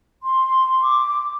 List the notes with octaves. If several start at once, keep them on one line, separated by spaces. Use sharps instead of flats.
C6
D6